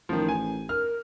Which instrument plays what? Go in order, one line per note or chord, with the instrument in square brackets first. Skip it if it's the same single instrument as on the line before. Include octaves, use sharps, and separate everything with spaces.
[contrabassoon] A1 [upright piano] D#3 F3
[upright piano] G#5
[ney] A#4 [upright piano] F6